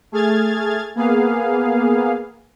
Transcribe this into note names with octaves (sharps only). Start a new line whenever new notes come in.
A3 G#4 F6 G#6 A6
A#3 B3 G#4 F5